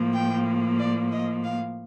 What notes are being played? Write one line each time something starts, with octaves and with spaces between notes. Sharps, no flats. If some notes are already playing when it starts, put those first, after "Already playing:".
Already playing: A2 F3 A#3
G5
D5
D#5
F5